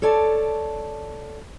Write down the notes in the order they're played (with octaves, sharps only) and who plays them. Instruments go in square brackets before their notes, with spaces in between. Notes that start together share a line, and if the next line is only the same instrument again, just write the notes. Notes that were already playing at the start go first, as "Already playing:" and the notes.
[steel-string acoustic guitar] A4 C#5 D5 A5